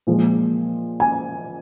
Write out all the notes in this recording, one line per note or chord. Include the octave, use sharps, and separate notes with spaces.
A#2 F3 G#3
G#5